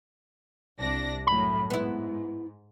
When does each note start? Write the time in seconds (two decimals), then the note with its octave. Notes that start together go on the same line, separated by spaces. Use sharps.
0.77 C2 D4 A#6
1.27 F#2 A2 F#3 B5
1.70 G#2 B3 E4